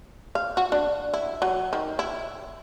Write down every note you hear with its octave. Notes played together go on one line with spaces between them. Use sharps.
F5
F#4
D4
E4
F#3
D#3
E4